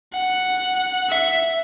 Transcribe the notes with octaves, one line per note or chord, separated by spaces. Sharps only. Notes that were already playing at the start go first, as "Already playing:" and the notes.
F#5
E5